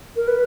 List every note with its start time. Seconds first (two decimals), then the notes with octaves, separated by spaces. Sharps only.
0.16 A#4
0.28 B4